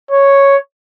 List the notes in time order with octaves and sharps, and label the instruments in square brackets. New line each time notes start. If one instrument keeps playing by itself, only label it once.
[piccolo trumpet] C#5